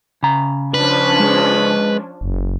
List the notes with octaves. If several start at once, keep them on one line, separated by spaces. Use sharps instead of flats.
C#3 A#5
F3 C#4 D4 B4
G#3
F#1